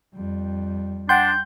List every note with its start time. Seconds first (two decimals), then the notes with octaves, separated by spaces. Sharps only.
0.15 F2 G3
1.09 D4 F#5 G5 C6 G6